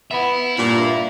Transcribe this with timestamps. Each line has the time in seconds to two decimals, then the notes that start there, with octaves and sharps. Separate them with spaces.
0.11 B3 E5 F#5 B5
0.57 G2 A#2 F5 A#5